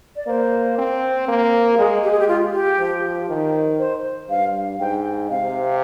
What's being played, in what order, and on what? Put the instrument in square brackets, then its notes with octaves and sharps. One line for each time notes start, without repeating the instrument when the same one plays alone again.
[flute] D5
[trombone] A#3 [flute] C5
[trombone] C4
A#3
[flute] G4
[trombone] G#3 [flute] G#4
[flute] G4
G#4
G4
F4
G4
[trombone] F3
D#3
[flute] C5
[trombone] G2 [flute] F5
[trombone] G#2 [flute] G5
[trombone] C3 [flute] F5